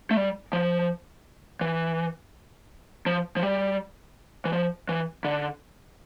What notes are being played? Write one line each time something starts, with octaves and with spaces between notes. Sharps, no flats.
A3
G3
F3
E3
F3
F3
G3
E3
F3
E3
D3